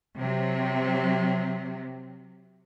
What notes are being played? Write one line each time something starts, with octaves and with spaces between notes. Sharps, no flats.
C3 F#3